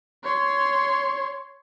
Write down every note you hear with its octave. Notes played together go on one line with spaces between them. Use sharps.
C#5 C6